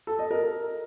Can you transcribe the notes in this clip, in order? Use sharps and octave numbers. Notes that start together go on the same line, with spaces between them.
A4
D#5
A#4